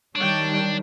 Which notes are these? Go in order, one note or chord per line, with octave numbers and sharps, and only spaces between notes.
D#3 G3 D4 C#5 G5